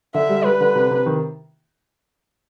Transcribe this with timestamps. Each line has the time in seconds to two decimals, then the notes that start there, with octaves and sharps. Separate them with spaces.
0.14 D3 E5
0.29 G3
0.45 G3 B4
0.60 D3
0.75 C3
0.91 C3
1.06 D#3